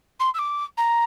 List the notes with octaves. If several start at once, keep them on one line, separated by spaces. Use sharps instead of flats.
C6
E6
D6
A#5